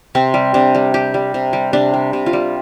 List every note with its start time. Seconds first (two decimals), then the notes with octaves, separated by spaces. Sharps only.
0.15 C3 C4
0.34 G3
0.54 C3 D4
0.75 G3
0.94 G3 G4
1.14 G3
1.34 C3
1.53 G3
1.73 C3 D4
1.94 G3
2.13 C3
2.26 F4
2.33 G3